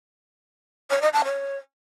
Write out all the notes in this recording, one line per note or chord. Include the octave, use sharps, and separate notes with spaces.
C#5
D#5
A5
C#5